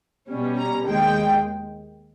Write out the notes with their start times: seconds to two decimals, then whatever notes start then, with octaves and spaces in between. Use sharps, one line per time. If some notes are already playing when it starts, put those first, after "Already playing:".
0.30 B2 G3 C#4
0.58 A#5
0.87 D#2 D#3 G#3 G5